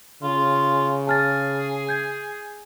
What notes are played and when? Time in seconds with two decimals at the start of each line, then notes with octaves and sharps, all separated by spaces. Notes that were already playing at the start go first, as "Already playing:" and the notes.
0.23 C#3 F4
1.07 G#4 A5 F6 A6
1.89 G6 G#6